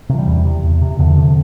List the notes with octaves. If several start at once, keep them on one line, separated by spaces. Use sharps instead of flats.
C3 F3
E3 G3
E2
C3
E2
C3
E2 D3 F3
C3